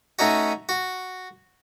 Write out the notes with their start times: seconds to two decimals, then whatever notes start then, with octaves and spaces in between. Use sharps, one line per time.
0.19 A3 C#4 D#4 F#4
0.69 F#4